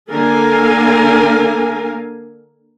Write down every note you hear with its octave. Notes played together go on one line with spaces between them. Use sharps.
D3 A#3 A4 A#4 F5 G#5